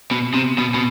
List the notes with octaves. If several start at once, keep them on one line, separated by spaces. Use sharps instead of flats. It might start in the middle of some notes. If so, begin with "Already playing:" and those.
B2
C3
B2
B2